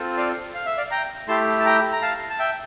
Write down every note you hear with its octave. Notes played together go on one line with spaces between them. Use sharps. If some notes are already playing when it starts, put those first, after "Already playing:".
Already playing: C4 F4 A4
D5 F5
F5
E5
D5 F5
G5 A#5
A3 E4 G4 A5 C6
A5
G5 A#5
A#5
F5 A5
A5
E5 G5